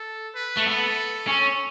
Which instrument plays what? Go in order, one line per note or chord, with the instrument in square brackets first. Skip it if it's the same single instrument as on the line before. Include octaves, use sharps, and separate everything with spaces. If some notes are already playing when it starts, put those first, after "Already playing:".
Already playing: [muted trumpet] A4
B4
[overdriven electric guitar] A3
[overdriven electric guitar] B3 [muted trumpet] A4
[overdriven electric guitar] C#4